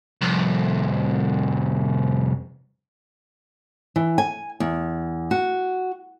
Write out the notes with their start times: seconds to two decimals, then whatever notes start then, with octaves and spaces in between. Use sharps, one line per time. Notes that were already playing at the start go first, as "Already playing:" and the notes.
0.21 C2 F2
3.96 E3
4.18 G#5
4.60 E2
5.31 F#4